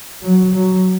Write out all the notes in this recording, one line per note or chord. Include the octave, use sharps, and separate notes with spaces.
F#3
F#3